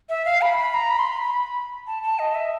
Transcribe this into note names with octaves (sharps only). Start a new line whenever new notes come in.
E5
F5
B5
B5
A#5
B5
C6
B5
B5
A5
A5
D#5
E5